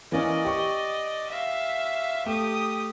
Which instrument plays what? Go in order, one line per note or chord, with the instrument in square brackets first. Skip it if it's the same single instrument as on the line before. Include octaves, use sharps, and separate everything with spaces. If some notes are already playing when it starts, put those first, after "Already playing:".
[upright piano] E3 A#3 C#4 [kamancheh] D5 D#5
[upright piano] G4 C#6
[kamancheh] E5 F5
[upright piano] A3 [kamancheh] G4 D#6